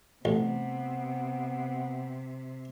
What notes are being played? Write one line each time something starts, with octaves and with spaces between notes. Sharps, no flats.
A1 C3 B3